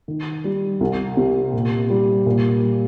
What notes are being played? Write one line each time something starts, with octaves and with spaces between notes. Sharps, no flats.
D#3
G3
C2
C3
A#2
G3
A#2
G3